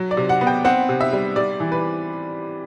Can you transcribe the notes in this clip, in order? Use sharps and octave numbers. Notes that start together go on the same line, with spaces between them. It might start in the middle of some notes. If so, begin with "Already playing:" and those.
Already playing: F#3
D5
C3
F#5
B3
G5
C4 F#5
C3
E5
G3
G3 D5
E3
B4